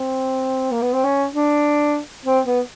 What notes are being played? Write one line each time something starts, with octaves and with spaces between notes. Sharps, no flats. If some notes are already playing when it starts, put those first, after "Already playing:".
Already playing: C4
A#3
B3
C4
C#4
D4
C4
B3